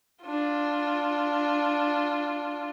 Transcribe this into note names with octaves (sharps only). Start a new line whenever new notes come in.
D4 F4